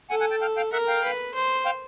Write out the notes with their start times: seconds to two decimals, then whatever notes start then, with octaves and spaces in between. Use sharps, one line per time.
0.10 A4 F#5 G#5
0.20 F#5 G#5
0.31 G5 A5
0.42 F5 G5
0.57 F5 G5
0.72 A#4 E5 F#5
0.88 F5 G5
1.04 B4
1.34 C5
1.66 F5 G5